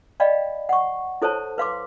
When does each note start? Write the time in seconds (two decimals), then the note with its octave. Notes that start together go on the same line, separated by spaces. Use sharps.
0.20 D5 D#5 F5 G5 B5
0.69 F#5 C#6
1.22 E4 A4 C5 C#5 A5
1.58 B4 F5 C6 D6